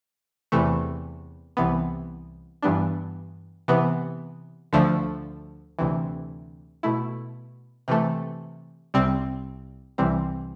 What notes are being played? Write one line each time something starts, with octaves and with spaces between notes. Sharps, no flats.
E2 C3 E3 A3
C2 C3 E3 B3
G2 E3 G3 B3 D4
C3 E3 B3
D2 D3 F3 A3
D2 C3 E3
B2 A3 E4
C3 E3 A3
C2 C3 G3 C4
C2 C3 E3 G3 C4